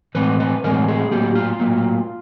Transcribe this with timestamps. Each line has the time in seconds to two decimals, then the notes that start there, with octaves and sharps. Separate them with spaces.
0.15 A2 E3 G#3 C4 B4
0.40 B4
0.64 A2 E3 G#3 C4 A#4
0.88 G#4
1.11 A2 F#3 A#3 G4
1.35 F4
1.60 A2 F#3 A#3